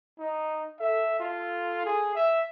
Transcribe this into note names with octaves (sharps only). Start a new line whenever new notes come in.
D#4
A4 E5
F4
G#4
E5